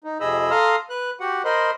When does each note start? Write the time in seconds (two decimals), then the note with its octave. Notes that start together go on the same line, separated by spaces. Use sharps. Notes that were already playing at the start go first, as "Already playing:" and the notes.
0.04 D#4
0.20 F2 C3 G#4 D#5 B5 E6
0.51 A4 F5 A#5 C6 D#6 F6
0.90 B4 F#6
1.20 F#4 G4 F#5
1.45 A#4 C5 D#5 B5 C6